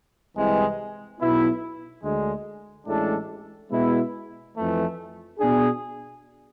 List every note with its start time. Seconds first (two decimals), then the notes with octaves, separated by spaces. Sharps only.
0.35 C2 C3 E3 G#3
1.19 B1 B2 B3 E4
2.03 D2 D3 G#3
2.87 A1 A2 G#3 D4 A4
3.71 B2 G#3 B3 E4
4.56 F2 E3 A3
5.39 B2 B3 D4 G#4